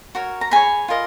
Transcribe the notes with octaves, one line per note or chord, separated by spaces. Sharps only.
F#4 A#4 C#5
A#5
G#4 C#5 G#5 B5
F4 A#4 D#5